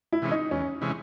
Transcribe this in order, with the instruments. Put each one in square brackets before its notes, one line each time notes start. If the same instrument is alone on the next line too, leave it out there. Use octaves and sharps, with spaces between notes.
[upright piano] E4
[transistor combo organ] C3 E3 G#3 C#4
[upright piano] D#4
[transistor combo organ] E2 [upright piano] C#4
[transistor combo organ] C3 E3 G#3 C#4